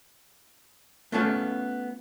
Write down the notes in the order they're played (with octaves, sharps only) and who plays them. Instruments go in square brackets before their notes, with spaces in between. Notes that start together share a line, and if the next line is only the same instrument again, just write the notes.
[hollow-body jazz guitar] A3 B3 C#4 F4 G4 A4